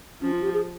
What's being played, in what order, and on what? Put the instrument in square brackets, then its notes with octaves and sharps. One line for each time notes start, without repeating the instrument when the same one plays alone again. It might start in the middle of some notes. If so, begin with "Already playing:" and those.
[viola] F3 [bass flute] C#4
[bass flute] F4
G4
G#4